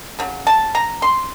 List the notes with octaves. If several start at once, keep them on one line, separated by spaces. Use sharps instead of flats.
C#3 F#3
A5
A#5
C6